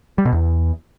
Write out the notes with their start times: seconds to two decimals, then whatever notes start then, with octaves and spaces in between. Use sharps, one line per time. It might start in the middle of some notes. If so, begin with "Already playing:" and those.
0.18 G3
0.25 B2
0.33 E2